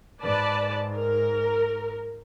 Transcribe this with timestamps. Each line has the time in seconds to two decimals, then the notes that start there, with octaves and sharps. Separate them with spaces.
0.22 G#2 B4 D5 A5
0.95 A#4